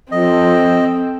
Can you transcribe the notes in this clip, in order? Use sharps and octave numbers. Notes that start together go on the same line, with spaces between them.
F3 C4 A4 D#5